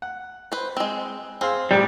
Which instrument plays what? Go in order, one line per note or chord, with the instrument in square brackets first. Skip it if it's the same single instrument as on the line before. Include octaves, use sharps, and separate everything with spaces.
[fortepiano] F#5
[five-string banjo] B4 C5
G#3 C4
[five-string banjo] C4 [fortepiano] G#4 F5 C6
[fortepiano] A1 G4 D5 [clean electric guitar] G3